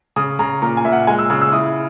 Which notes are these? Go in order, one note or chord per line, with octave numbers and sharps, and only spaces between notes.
C#3 D#6
C#3 A#5
A#2 A#5
G#5
A#2 E5
F#5
G#3 G#5
E6
C#3 E6
E6
E4 D#6